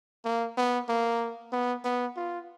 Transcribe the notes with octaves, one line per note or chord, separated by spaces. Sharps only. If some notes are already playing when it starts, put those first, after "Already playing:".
A#3
B3
A#3
B3
B3
F4